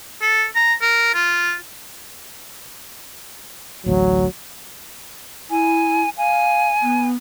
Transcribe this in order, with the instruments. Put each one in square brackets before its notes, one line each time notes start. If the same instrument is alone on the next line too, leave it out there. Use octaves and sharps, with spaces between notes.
[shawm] A4
A#5
A#4
F4
[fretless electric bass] A1 D2 [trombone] F#3
[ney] E4 [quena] G#5
[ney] F5 [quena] G#5
[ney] B3